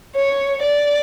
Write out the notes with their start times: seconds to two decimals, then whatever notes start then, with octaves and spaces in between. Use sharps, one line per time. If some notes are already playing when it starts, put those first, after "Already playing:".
0.15 C#5
0.63 D5